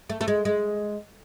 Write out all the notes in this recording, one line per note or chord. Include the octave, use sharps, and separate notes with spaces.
A3
A3
G#3
G#3